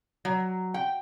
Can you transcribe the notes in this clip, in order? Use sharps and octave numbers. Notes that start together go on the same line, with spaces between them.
F#3
G5